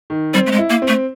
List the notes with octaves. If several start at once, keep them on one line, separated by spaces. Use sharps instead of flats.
D#3
G3 C4
A3
G#3
E4
A#3
C4
A3